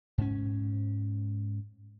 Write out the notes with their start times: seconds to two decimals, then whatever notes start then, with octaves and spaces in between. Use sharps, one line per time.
0.18 G#2 C#4